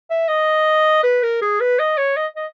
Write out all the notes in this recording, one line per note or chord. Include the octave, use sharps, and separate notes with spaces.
E5
D#5
B4
A#4
G#4
B4
D#5
C#5
D#5
D#5